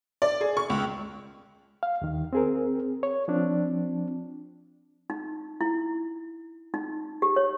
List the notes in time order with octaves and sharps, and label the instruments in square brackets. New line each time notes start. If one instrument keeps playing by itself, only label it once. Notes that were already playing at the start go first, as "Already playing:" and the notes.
[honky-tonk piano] D5
G#4
C#6
C#2
[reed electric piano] F5
D#2 D#3
C4 G#4 A#4
C#5
F3 C4 D4
[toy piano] D#4
E4
D#4
G4
C#5